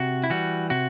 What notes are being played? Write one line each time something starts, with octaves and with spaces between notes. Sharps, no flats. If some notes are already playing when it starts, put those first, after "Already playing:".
Already playing: C3 F#4
E4
E3 G3 F#4
C3 F#4